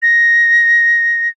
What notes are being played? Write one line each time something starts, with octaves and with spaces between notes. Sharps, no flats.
A#6